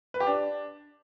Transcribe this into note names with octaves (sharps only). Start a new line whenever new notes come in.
B4
G4
D4